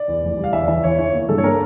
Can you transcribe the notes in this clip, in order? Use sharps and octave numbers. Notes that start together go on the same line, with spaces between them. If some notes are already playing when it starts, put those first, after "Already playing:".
Already playing: D5
E2
F1
G3
F5
E2 E5
D5
E3 E5
E2 C#5
E3 C#5
A#3
G2 A4
C#5
A#3 A#4